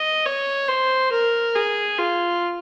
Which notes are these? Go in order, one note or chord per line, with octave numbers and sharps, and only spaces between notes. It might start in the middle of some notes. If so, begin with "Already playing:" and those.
Already playing: D#5
C#5
C5
A#4
G#4
F4